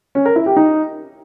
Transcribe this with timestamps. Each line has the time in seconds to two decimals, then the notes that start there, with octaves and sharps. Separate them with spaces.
0.15 C#4
0.25 A#4
0.36 E4
0.46 G4
0.56 D#4